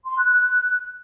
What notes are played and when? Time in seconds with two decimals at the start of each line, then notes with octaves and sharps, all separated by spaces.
0.06 C6
0.18 F#6
0.29 F#6